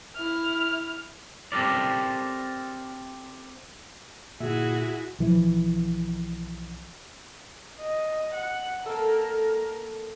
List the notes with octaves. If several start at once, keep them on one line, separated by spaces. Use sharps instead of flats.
E4 F6
C4 G4 A4 A#4 D5
G1 A#2 E4 F#4 G#4 E5
B1 E3 F3
D#5
F#5
A#3 A4 A#4